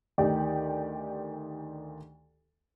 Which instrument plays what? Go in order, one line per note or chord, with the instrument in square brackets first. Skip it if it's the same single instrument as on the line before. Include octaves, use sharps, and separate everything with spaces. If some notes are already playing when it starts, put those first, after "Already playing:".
[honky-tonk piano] D2 D#3 D#4 G4 D5 G5